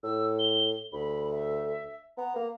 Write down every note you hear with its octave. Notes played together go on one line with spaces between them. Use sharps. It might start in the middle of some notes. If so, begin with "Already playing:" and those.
A2 E6
G7
D2 B5
E5
B3 A#5
A#3